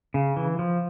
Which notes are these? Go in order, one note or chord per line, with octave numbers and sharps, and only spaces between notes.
C#3
E3
F3